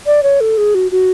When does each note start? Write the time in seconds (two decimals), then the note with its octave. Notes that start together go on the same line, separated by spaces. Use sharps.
0.06 D5
0.23 C#5
0.41 A4
0.58 G#4
0.75 F#4
0.92 F#4